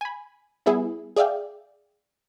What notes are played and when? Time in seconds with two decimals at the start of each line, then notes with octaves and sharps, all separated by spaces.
0.01 G#5 B5
0.66 G3 B3 E4 G#4
1.16 G#4 D5 E5 F5 G5